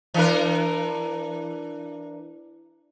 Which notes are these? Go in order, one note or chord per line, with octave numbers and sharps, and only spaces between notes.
E3 D4 A#4